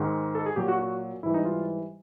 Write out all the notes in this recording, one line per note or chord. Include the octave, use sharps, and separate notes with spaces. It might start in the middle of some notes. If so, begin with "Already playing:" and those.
Already playing: G#2 D#3 G#3
A4
G#4
A#2 F#3 G4
F#4
F#4
G#2 E3 G3 E4
D#4
F4